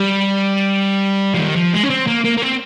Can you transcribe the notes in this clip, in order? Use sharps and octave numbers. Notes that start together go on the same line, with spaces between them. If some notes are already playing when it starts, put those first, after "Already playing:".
Already playing: G3
F3
D#3
F3
G#3
C#4
C4
A#3
A#3
A#3
C4